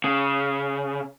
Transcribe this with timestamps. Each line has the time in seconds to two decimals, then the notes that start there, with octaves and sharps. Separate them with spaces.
0.04 C#3